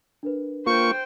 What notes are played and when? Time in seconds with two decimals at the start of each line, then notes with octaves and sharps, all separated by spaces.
0.23 D4 A#4 B4
0.67 A#3 F4 C5 G5 C#6